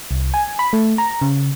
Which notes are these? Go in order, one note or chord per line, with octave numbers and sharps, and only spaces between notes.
C2
G#5
B5
A3
A#5
C#3